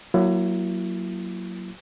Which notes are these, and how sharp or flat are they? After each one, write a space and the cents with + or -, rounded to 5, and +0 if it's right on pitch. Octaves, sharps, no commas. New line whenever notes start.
F#3 +0 A#3 +0 E4 +30